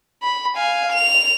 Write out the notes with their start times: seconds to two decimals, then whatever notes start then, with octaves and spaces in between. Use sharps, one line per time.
0.23 B5
0.56 F5 G#5
0.93 F7